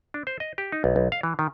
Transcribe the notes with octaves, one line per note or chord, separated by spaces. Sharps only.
D4
C5
D#5
G4
D#4
B1
B1
F5
E3
D#3